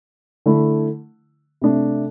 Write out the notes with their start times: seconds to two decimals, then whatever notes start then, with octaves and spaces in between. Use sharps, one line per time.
0.46 D3 A3 E4
1.62 C3 A3 D4